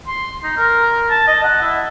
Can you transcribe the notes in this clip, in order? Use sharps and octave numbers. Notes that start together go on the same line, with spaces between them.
C6
D#4
A#4
A5
D#5
F#5
E4